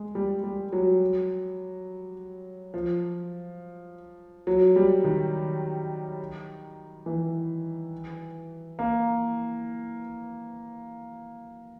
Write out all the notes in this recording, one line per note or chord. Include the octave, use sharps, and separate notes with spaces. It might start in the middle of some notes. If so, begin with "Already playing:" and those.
Already playing: G#3
G3
G3
F#3
F3
F#3
G3
D#3
E3
A#3